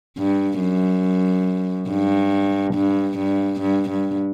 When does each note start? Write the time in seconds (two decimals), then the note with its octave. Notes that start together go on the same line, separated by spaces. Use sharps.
0.18 G2
0.60 F#2
1.90 G2
2.75 G2
3.18 G2
3.61 G2
3.90 G2